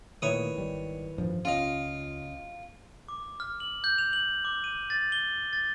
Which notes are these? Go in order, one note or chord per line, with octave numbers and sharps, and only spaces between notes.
D2 A#2 D#3 E4 B4 C#5 D#6
G#1 G3
A1 G2 F3
C#2 C#4 F4 D#5 F5
D6
F6
F#7
G6
F7
F#7
D6
D#7
A6
G7
A6